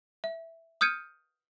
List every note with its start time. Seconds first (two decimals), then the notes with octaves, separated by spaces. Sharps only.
0.24 E5
0.81 D#6 F6 G6 G#6 C#7 D#7